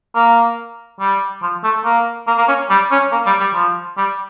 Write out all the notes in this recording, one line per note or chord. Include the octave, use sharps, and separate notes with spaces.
A#3
G3
F3
A3
A#3
A#3
A#3
C#4
G3
C#4
A#3
G3
G3
F3
G3